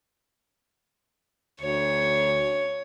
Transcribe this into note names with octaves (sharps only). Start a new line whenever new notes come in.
D2 C#5